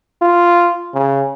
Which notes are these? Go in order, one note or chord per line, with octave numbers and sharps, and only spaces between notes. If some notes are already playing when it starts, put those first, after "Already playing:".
F4
C#3